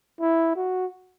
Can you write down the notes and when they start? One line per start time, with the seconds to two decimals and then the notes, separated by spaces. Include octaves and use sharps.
0.21 E4
0.56 F#4